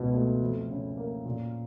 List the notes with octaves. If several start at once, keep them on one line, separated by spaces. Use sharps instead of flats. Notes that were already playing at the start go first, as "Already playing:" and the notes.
Already playing: C#2 B2
A3
F2
C#3
A#3
A#2